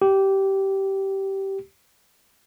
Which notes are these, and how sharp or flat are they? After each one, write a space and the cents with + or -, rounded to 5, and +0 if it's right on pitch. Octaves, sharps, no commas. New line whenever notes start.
G4 -15